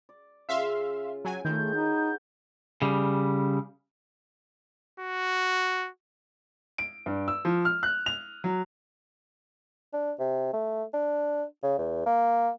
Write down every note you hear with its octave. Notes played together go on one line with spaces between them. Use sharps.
D5
C#3 F4 E5 F5 C6
F#3 G5 G#5
D#3 A3 E4 F4 G#4 G6
D#4 F#4 A#4 B4
C#3 G3
F#4
D7
G2
E6
F3
F6
F#6
F7
F#3
D4
C3
A3
D4
C#3
E2
A#3